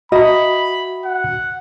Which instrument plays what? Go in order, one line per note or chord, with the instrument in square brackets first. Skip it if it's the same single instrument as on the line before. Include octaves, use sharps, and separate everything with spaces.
[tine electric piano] F#4 E5 A#5 [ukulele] D#5 [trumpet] B5
[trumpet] F#5